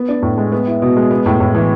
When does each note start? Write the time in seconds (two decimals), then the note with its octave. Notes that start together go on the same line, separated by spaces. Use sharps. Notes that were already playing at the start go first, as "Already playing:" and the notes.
Already playing: B3
0.09 D4
0.22 A2
0.38 G#3
0.52 B3
0.67 E4
0.82 B2
0.96 G#3
1.11 B3
1.26 A2
1.40 A2
1.55 E3